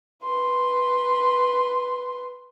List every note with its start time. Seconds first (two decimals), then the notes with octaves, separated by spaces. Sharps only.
0.24 B4 C6